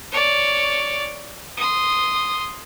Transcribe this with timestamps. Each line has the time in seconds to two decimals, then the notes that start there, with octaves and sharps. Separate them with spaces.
0.12 C#5 D5
1.57 C6 D#6